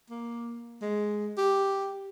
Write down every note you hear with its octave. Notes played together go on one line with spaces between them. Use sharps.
A#3
G#3
G4